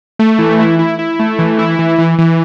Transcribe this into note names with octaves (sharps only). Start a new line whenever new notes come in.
A3
E3
E4
E4
E4
A3
E3
E4
E3
E3
E3